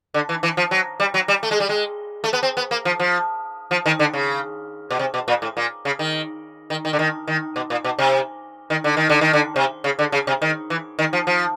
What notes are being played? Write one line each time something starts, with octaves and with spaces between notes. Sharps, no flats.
D3
E3
E3
F3
F#3
G3
F#3
G3
A3
G#3
G3
G#3
A3
B3
C4
B3
A#3
F3
F3
F3
D#3
D3
C#3
B2
C3
B2
A#2
A2
A#2
C#3
D#3
D#3
D#3
D3
D#3
D#3
B2
A#2
B2
C3
D#3
D3
D#3
D3
D#3
D3
C3
C#3
D3
C#3
C3
D#3
E3
D#3
F3
F3